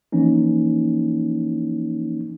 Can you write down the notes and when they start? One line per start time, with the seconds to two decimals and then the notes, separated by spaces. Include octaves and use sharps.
0.12 E3 F3 A#3 C#4 D#4